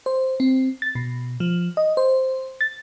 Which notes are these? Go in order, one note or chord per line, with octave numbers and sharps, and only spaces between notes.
C5
C4
A6
B2
F3
D#5
C5
A6